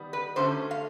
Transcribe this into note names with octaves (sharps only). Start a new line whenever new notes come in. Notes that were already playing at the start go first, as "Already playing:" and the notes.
Already playing: D#3 G3 B3
B4
D3 F#3 A3 C#4 C5
F5